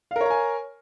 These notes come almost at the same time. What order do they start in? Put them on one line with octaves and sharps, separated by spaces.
F5 A#4 C#5 A#5 G#5